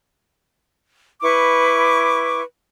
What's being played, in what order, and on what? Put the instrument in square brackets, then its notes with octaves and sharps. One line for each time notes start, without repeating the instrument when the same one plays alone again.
[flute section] E4 B4 C#6 D6